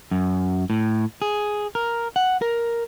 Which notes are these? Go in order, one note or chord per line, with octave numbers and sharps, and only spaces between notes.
F#2
A2
G#4
A#4
F#5
A#4